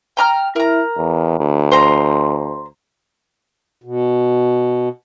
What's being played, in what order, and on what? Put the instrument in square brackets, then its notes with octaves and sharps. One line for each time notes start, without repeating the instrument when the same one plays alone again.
[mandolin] G5 A#5 F6
[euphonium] E4 [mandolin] A#4 A#5
[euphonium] E2
D2
[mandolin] C5 A#5
[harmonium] B2